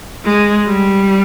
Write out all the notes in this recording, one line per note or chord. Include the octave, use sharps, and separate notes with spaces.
G#3
G3